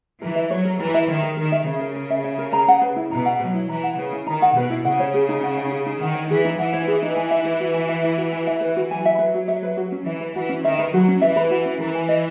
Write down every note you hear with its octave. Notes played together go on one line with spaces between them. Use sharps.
E3 A#4
E5
F#3 C#5
A#4
E3 A#4
E5
D#3 C#5
A#4
D#3 A#4
E5
C#3 C#5
A#4
A#4
E5
C#5
A#4
A#5
F#5
B4
E4
B2 A#5
F#5
F#3 B4
E4
E3 A#5
F#5
C#3 B4
E4
D#3 A#5
F#5
B2 B4
E4
C#3 F#5
C#5
G#4
D#4
F#5
C#5
G#4
D#4
D#3 F#5
C#5
E3 G#4
D#4
E3 F#5
C#5
G#4
D#4
G#5
E5
B4
F#4
G#5
E5
B4
F#4
G#5
E5
B4
F#4
F#3 G#5
E5
B4
F#4
E5
B4
F#4
C#4
E3 E5
B4
E3 F#4
C#4
D#3 E5
B4
F#3 F#4
C#4
E3 E5
B4
F#4
C#4
E3 A#4
G#5
D#5